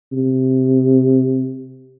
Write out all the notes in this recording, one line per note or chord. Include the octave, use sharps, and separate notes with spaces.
C3